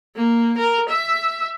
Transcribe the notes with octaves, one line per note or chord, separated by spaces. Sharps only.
A#3
A#4
E5